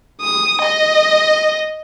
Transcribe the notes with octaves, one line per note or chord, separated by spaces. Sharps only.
D#6
D#5